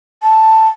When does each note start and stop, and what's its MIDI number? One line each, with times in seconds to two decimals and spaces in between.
0.23 0.68 81